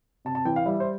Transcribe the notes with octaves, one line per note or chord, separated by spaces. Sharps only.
C3 A5
A5
E3 G5
F5
G3 E5
C5